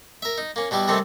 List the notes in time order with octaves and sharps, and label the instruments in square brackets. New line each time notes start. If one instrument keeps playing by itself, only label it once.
[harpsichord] A#4 E5
D#4
A#3 C#4
B2 G3 E4 G4
C3 D#3 G3 A3 C4 C#4